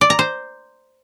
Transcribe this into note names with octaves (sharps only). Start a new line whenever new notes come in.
D5
A#5
C5